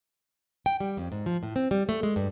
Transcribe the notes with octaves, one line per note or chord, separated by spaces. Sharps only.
G5
G3
F2
G#2
F3
A2
C4
G3
A3
G#3
G2